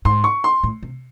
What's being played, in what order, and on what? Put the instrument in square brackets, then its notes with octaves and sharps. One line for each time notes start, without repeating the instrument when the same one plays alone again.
[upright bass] G#2 [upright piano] C6
[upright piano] C#6
C6
[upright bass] A2
C3